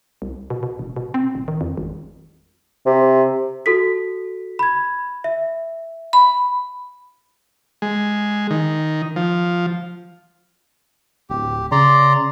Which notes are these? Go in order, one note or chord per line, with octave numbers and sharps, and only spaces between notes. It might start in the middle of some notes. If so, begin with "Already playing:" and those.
C2
B2
B2
E1
B2
C4
D#1
D#3
F2
G#1
C3
F#4 A4 B6
B5 G#6
E5
B5
G#3
D#3
F3
D1 G4
C#3 D5 A#5 C6